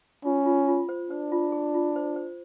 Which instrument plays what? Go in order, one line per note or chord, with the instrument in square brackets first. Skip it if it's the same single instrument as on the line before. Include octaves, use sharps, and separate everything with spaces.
[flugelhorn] C#4 [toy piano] F4
[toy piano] F4
F4
C5
[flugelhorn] D4 [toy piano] C5
[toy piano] F4
G#4
F4
C5
C5